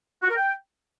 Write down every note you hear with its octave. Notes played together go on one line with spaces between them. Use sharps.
F#4
A#4
G5